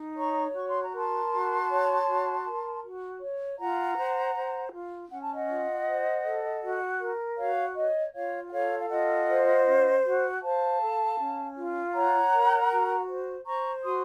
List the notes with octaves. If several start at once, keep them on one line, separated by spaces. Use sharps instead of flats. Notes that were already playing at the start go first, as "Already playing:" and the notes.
Already playing: D#4
C#5 A#5 C#6
F#4 C#6
C6
A#5
A#4 A5 C6
F#4
C#5
F#4
A#4
F#4
C#5
F4 F#5 A#5
C5
C5
F4
C#4 F#5
A5
D#5 F#5
F4
C5
A4
F#4
A#4
F#4 C#5 F5
C#5 D#5
F4 C#5 F5
F#5
A4 C#5 F5
F5
F4 D#5 F#5
C5
C#4
F#4
C5 F5 A5
A4
C#4
F4
C#5 F#5 A#5
A#4
F#4
C5
C5 A#5 C#6
F#4 C6 D#6